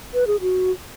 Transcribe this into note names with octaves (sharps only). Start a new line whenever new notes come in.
B4
G#4
F#4